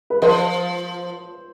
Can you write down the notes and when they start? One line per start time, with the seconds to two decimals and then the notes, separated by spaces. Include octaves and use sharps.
0.10 B4
0.22 F3 C5